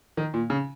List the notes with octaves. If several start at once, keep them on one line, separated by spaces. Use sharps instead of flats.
D#3
A#2
C#3